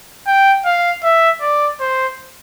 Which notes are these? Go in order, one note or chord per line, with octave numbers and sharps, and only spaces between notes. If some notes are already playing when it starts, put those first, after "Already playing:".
G5
F5
E5
D5
C5